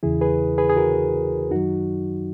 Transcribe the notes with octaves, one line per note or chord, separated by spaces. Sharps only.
E2 C#3 E3 E4 G#4
G#4 B4
G#4 B4
G#4
F#4 A#4
F#2 D#3 F#3 D#4 F#4